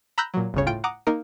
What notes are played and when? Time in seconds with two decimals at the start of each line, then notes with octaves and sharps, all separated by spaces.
0.18 A#5 B5 E6 F#6 G6 A#6
0.34 A#2 F#3
0.54 G1 D2 C#3 C#5
0.66 A2 F4 G5 D7
0.84 F#5 A#5 D6 D#6
1.07 A#3 D#4 A#4